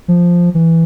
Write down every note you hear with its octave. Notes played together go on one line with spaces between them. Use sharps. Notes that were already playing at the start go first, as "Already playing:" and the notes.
F3
E3